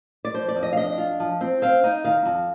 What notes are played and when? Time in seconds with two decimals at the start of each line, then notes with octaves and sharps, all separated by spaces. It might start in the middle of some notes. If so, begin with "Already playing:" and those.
0.25 D5
0.34 F3 C5
0.48 D5
0.55 F2
0.63 D#5
0.72 F5
0.77 D4 D#5
0.98 F4
1.20 F3
1.41 C4
1.62 C4 F5
1.83 D#4
2.04 D#3 F5
2.25 F2